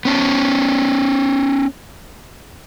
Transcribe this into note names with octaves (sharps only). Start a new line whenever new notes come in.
B3 C#4 A5